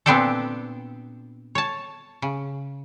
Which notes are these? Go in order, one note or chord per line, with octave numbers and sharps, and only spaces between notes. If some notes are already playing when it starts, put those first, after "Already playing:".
A#2 B3 C4 D4 G4 A4
C#5 A5
C#3